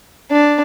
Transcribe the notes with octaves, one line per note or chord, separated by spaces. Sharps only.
D4